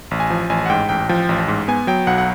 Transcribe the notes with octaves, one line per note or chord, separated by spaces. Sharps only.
A1
G#5
F3
A1 G#5
F#5
G#2 G5
A1 G5
F3 G5
A1
G#2
B3 G#5
F#3 G5
B1 F#5
F#5